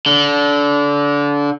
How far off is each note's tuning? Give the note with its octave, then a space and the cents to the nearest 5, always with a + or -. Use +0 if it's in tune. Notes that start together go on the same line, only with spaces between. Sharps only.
D3 -25